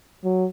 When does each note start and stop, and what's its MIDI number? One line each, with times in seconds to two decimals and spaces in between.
0.24 0.46 54